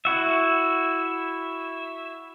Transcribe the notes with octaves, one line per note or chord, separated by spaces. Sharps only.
E4 F#4 E5